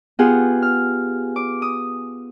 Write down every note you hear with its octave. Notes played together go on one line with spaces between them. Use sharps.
B3 F4 G4 G#4 F#5
F6
D6
D#6